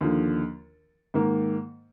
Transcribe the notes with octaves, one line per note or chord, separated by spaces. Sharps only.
D#2 D3 F3
G#2 D#3 A#3